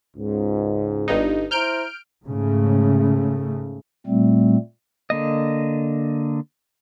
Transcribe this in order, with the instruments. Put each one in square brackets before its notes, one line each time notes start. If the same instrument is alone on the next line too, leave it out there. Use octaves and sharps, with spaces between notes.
[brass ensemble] C#2 G#2
[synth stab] G1 G2 D#4
[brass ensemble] E4 C5 A#5 [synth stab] F6 G6 D7
[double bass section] G#2 C#3 A3
[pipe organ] A#2 G3 A3 C4
[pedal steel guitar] D3 A#3 D#5